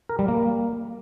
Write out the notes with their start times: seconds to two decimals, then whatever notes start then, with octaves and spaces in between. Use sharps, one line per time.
0.09 A#4
0.19 G3
0.28 A#3